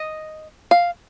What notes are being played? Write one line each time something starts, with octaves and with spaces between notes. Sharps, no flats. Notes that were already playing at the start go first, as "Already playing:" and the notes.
Already playing: D#5
F5